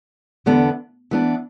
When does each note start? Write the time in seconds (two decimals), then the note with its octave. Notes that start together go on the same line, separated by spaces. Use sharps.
0.46 E2 D3 B3 D4
1.11 E3 B3 D4